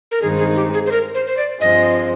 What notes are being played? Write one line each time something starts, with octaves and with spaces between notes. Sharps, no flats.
A#4
G2 D#3 G#3 C4 D#4 G#4
G#4
G4
G#4
C5
A#4
C5
C5
D5
G2 F3 G#3 C4 D#5